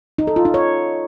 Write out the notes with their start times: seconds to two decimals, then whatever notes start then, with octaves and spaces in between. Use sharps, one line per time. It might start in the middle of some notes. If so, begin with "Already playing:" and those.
0.18 D#4
0.27 A4
0.36 F4
0.45 D#4
0.54 C#5